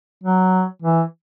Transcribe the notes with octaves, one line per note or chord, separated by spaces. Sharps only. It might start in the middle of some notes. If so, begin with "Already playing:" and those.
F#3
E3